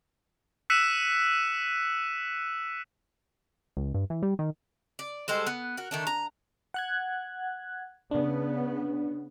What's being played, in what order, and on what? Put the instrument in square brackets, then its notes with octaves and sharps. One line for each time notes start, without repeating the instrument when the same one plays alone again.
[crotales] E6 F#6 B6 C#7 D#7 E7
[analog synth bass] C#2
G2
E3
G3
D#3
[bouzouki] D5
G3 G#3 A4 C5
B3
F#4 A#4
D#3 A3 D4
A#5
[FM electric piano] F#5 F#6 G#6
[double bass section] C#3 B3 [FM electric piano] D4